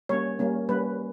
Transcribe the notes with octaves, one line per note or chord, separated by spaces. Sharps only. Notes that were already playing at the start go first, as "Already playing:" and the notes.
G3 A#3 C#4 C#5
G3 A#3 C#4
G3 A#3 C#4 B4